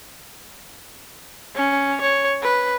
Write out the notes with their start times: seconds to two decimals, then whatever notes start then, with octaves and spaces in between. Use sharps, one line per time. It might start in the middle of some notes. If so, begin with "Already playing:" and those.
1.55 C#4
2.01 C#5
2.43 B4